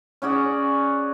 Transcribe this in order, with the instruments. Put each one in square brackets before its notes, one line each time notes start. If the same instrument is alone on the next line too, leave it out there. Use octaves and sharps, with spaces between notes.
[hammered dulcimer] C#4 F#4 G#4 D5